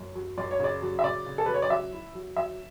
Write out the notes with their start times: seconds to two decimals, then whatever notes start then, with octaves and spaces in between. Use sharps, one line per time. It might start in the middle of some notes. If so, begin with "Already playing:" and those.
Already playing: F#2
0.15 F#3
0.38 F#2 D5
0.51 C#5
0.60 C#3 D5
0.82 F#3
0.99 E5
1.04 C#3 D5
1.26 C#3
1.38 A4
1.46 F#3 B4
1.54 C#5
1.62 D5
1.70 F#3 E5
1.93 E4
2.15 F#3
2.36 F#3 E5